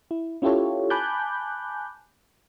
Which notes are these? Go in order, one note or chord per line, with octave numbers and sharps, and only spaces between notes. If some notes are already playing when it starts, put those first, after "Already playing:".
E4
C#4 E4 F4 G4 A4 C#5
G#5 A5 B5 D6 F#6 G6